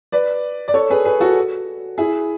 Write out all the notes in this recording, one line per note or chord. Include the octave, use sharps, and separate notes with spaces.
B4 D5
D5
A4 C#5
G#4 B4
G#4 B4
F#4 A4
E4 G#4